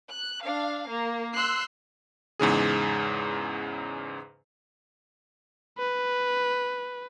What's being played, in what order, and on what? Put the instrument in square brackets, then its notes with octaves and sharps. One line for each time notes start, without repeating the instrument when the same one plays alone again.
[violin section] F#6
D4 F5
A#3
C6 E6 F#6 C7
[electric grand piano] E2 G#2 C#3 G#4
[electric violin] B4